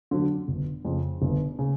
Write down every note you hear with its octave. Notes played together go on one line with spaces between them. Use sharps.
D3 F#3
G1
F2 C#3
G1
C#3